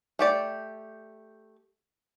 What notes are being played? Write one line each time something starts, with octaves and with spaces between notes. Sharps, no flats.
A3 G4 D5